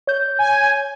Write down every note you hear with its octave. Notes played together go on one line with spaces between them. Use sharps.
C#5 G6
G#5